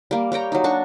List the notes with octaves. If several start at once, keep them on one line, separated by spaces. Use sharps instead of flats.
G3 A#3
G3 C#5 G5 A#5
F#3 D#4
D4 F#4 C#6